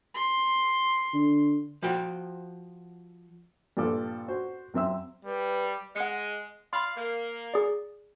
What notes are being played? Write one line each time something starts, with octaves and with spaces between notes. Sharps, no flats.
C6
D3
F3 F#4 G5
G2 A#2 F3 A4 D6
F#4 C5
F#2 C4 E5 E6
G3 B4
G#3 F#5 C#7
D5 F5 B5 C6
A#3
G#4 D5